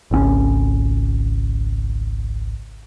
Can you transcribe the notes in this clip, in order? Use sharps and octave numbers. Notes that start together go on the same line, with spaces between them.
G#1 C#2 C4 C#4